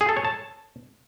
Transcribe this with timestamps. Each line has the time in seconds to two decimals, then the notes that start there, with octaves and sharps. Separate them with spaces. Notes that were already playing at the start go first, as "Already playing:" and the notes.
0.01 G#4
0.09 A4
0.17 C#5
0.25 A5